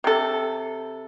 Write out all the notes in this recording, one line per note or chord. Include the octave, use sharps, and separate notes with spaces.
C3 A4